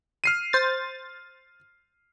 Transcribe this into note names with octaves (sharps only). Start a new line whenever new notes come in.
F6 C7 D#7
C5 A6